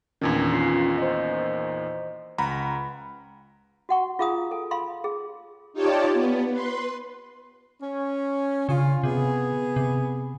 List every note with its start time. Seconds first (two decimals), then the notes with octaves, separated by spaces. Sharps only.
0.21 E2 A#2 D#3 C#4 D4 G#6
0.53 C#4 F4 C7
0.98 C5 D#5
2.38 C#2 F#5 A#5 B5
3.89 F#4 F#5 C#6
4.19 F4 G#4 F5 A#5 D#6
4.51 A4 G#5
4.71 F5 B5 C6
5.04 G#4
5.73 D#4 F4 G4 C#5 D5 A5
6.13 B3
6.52 B4 C6
7.81 C#4
8.69 C#3 C#4 D4 F4
9.03 C3 B3 G#4
9.76 C3